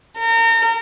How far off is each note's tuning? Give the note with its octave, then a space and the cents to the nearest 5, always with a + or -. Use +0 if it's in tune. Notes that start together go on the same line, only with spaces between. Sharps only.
A#4 -35